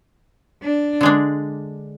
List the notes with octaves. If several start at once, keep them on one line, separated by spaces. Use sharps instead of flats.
D4
D3 G#3 D4